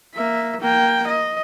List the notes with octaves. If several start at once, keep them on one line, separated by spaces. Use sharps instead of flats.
A#3 E5
A#3 G5
D#5